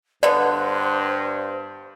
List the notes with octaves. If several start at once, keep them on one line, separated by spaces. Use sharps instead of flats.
G2 D3 B3 C5 D5